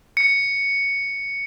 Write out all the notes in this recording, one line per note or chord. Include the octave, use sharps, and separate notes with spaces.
C#7